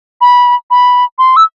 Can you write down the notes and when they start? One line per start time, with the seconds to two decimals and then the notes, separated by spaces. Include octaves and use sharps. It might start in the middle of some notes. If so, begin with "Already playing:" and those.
0.21 B5
0.71 B5
1.19 C6
1.36 E6